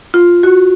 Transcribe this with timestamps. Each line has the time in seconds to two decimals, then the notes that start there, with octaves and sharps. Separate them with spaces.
0.14 F4
0.43 F#4